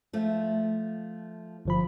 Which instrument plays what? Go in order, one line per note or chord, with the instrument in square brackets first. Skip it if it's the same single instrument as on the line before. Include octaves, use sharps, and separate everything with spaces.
[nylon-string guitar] F3 A3
[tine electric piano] G1 F3 B5